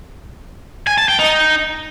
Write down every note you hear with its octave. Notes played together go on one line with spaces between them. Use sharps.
G#5
A5
G5
D#4